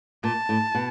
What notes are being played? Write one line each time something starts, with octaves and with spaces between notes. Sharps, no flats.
A#2 A5
A2
B2